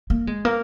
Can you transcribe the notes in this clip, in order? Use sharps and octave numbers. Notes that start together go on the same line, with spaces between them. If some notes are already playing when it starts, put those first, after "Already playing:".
A#3
G#3
A#3